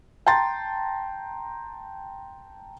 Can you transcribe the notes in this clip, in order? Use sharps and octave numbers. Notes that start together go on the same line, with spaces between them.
G5 A5 A#5 C6 A6